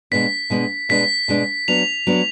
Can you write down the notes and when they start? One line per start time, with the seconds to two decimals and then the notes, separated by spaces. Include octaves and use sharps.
0.11 B2 G#3 B3 D4 B6
0.50 B2 G#3 B3 D4
0.89 B2 G#3 B3 D4 B6
1.28 B2 G#3 B3 D4
1.68 F#3 B3 D4 F7
2.07 F#3 B3 D4